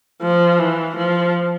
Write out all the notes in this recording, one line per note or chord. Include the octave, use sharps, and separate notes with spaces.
F3
E3
F3